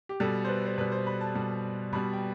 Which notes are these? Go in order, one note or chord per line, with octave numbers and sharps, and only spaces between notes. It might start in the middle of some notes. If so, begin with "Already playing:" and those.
G4
B2 G3 A4
C5
B4
C5
B2 G3 B4
C5
B5
A5
B2 G3
B2 G3 B5
G5